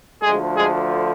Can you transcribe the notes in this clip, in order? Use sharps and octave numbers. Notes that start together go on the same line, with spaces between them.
D2 D3 F3 G#3 G#4
G#3 G#4